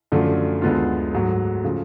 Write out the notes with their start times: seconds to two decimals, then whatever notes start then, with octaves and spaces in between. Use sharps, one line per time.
0.12 F#2 D3 F3 A3 D4
0.62 D2 D3 G#3 B3 F4
1.13 G#2 F#3 A3
1.64 C#3 F3 A3